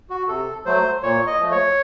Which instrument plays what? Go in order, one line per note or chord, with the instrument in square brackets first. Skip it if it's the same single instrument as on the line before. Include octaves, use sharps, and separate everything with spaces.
[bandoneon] F#4
C3 A4
F#3 A3 C5
A#2 C#5
D#5
F3 A3
C#5